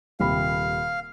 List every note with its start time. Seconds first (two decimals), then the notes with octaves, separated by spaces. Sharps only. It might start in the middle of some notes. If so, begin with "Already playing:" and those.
0.20 D#1 C3 F5 B5